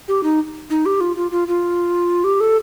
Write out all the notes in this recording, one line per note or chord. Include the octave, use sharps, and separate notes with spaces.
G4
D#4
D#4
G4
F4
F4
F4
F4
G4
A4